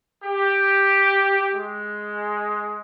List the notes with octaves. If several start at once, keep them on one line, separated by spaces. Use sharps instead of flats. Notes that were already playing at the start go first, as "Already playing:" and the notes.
G4
G#3